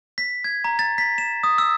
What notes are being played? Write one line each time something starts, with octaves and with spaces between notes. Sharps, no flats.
B6
G#6
A#5
A6
B6
E7
D#6
E6